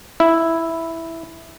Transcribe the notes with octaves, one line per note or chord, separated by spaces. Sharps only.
E4